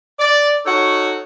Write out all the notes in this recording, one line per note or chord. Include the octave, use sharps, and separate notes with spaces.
D5
D#4 F#4 A4 C#5